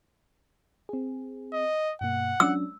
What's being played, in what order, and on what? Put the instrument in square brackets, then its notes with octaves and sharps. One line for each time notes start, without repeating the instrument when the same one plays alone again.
[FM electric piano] C4 G#4
[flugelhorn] D#5
[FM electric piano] G2 B2 A#3 [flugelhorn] F#5
[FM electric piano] F#3 C#4 D4 [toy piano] E6